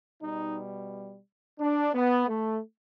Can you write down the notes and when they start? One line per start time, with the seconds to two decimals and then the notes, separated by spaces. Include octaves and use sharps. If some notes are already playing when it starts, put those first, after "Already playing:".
0.21 B2 G3 D#4
1.59 D4
1.93 B3
2.28 A3